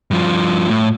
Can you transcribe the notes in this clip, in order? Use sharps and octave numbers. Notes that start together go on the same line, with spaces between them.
G2 F3
A2